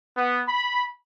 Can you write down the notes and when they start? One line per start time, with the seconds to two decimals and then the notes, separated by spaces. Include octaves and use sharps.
0.17 B3
0.48 B5